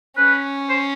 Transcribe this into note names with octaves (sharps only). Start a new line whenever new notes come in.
C#4 B4
C5